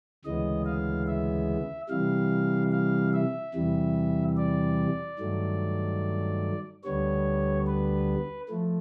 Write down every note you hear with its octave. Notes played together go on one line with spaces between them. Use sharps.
D2 C#3 E3 G#3 B3 D#5
F5
E5
C3 E3 G3 F5
F5
E5
E2 C3 E3 G3
D5
G2 D#3 F#3 A3
D2 D3 G3 B3 C#5
B4
F3 A3